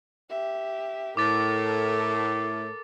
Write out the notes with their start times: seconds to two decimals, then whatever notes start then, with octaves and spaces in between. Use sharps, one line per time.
0.30 G4 E5
1.17 A2 A4 A#4 D6 A6